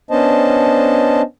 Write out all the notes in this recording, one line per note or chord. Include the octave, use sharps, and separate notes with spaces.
B3 C#4 D4 C5 D#5 A5